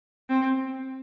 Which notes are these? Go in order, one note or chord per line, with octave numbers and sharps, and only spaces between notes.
C4